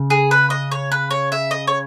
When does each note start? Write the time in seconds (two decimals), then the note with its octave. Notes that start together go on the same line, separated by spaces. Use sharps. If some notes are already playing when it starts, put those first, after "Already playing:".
Already playing: C#3
0.10 G#4
0.31 B4
0.50 D#5
0.72 C#5
0.92 B4
1.11 C#5
1.32 E5
1.51 D#5
1.67 C#5